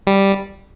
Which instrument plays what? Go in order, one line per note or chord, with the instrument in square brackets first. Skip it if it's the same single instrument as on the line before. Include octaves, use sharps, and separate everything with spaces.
[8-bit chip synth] G3